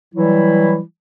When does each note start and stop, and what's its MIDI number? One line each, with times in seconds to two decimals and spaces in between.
0.14 0.79 52
0.14 0.79 54
0.14 0.79 55
0.14 0.79 64